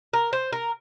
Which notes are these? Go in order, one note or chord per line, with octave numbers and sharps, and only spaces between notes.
A#4
C5
A#4